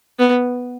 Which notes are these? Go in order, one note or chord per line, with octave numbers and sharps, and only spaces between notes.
B3